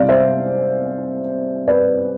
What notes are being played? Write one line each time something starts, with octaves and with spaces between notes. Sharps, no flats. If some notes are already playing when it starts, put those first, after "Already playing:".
Already playing: C3 G3 D5 F5
C5 E5
B4 D5